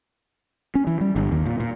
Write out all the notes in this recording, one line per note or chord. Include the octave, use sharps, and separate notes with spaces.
C#4
E3
G3
G1
D#2
A#2
A#2